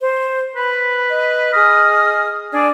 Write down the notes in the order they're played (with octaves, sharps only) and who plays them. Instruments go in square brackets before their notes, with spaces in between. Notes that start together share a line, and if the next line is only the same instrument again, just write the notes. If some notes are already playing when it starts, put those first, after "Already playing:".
[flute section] C5
[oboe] B4 [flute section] B5
[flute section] D#5
[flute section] G#4 D#6 F6 [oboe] D#5
[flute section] D4 D5 G#5 [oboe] G#4